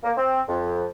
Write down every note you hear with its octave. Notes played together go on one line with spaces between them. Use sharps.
A#3
C4
F2